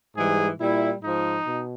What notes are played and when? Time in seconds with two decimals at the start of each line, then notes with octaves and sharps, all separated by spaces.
0.16 G#2 E3 G3 G#4
0.60 A#2 G3 E4
1.02 G#2 F3 D#4
1.46 B2